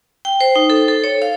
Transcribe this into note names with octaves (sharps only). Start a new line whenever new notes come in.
G5
C5
D#4
A4
A4
C#5
F5